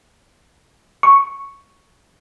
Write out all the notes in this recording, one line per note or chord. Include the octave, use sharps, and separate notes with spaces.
C#6